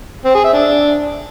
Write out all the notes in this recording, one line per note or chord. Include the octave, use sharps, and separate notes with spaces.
C4
G#4
E5
D4